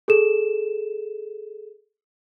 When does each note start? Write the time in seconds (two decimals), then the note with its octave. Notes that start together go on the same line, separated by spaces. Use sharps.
0.08 G#4 A4 E7